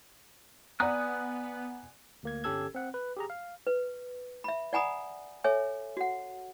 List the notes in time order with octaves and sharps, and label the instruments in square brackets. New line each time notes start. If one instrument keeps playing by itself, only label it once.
[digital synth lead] B3 [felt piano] D5 F#5 A#5 [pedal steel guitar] G#5 D#6 F#6
[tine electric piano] D2 A#3 G#6
G1 C#4 G4 A4 E6 G#6
C4 F#5
B4
G4 G#4 A#5
F5
[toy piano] B4
E5 B5
D5 F#5 G#5 A#5 B5 D#6
A4 C#5 E5 G#5
F#4 F#5